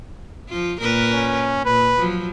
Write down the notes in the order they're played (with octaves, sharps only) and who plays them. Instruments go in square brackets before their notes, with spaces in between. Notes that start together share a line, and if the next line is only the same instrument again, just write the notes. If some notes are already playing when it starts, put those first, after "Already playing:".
[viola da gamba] F3 F4
A#2 A#4 B4
[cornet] C#4
[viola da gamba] A#2 [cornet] B4
[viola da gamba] F3 F#3